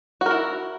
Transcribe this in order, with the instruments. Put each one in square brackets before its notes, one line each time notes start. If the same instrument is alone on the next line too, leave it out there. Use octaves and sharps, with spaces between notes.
[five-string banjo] F#4
A#4
E4